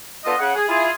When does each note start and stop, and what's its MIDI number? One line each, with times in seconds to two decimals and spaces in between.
0.25 0.33 50
0.25 0.33 59
0.25 0.33 65
0.25 0.33 69
0.25 0.33 75
0.39 0.52 49
0.39 0.52 78
0.55 0.67 68
0.68 0.90 64
0.68 0.90 65
0.68 0.90 68